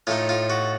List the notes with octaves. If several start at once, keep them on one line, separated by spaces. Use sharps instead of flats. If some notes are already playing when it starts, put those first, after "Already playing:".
A2 A3 D#4 F4
F4
F#4